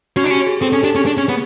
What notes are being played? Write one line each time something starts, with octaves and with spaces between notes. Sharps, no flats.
C#4 F#4
D4
C#4 G4
G#4
C4 A4
C#4 A4
D4 G4
C#4 G#4
D4
C#4
B3